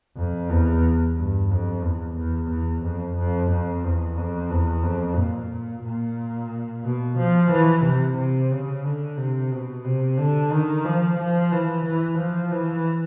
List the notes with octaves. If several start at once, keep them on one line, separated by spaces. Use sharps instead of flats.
F2
E2
G2
F2
E2
E2
E2
F2
F2
F2
E2
F2
E2
F2
A#2
A#2
B2
F3
E3
C3
C3
C#3
D3
C3
B2
C3
D3
D#3
F3
F3
E3
E3
F3
E3